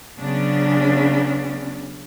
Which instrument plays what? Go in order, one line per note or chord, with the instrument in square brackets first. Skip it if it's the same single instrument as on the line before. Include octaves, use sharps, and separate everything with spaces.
[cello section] C#3 F#3 B3 C#4 D4